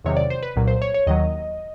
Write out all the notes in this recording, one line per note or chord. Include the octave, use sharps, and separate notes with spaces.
E2 C3 D#3 F#3 C#5
D5
C5
B4
C2 A#2 F#3
C5
C#5
C#5
D#2 D#3 F#3 D#5